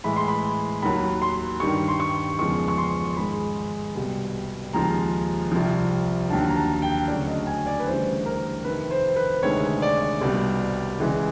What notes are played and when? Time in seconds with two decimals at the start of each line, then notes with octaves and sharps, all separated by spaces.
0.04 A2 E3 G#3 B5
0.17 C6
0.28 B5
0.82 D#2 D#3 F#3 B5
1.22 C6
1.60 G2 D#3 G3 C#6
1.88 C6
2.00 C#6
2.39 E2 C#3 F3 G#3 C#6
2.68 C#6
2.78 C6
3.11 C6
3.17 G#2 D#3 G#3 B5
3.95 C2 B2 G3
4.73 D#2 C#3 F3 G#3 A#5
5.52 C2 C3 F3
6.30 D#2 D3 F#3 A5
6.49 A#5
6.56 A5
6.82 G5
7.08 D2 C#3 F#3 D5
7.27 D#5
7.47 G#5
7.66 D5
7.80 B4
7.86 D2 C#3 E3 G3 C5
8.26 A#4
8.64 F2 C3 D#3 B4
8.91 C5
9.16 B4
9.43 D2 C3 D#3 G#3 C#5
9.82 D5
10.21 C2 B2 G3
10.99 C#2 C#3 E3 G#3